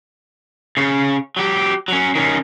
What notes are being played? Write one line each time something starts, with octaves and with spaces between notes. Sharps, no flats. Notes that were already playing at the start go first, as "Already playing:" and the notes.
C#3 C#5
F#3 G4
F#3 C#4
D#3 C#4